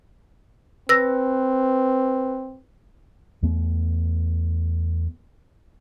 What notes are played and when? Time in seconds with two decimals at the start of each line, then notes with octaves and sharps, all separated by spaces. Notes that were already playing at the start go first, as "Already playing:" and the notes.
0.89 C4 B4 E6 A#6
3.43 E2 A3 B3